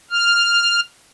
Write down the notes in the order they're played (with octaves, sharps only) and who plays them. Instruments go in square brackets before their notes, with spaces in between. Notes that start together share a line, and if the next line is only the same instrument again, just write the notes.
[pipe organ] F6